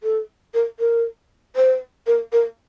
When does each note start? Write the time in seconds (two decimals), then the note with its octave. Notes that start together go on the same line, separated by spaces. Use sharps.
0.03 A4
0.54 A#4
0.79 A#4
1.56 C5
2.07 A#4
2.32 A#4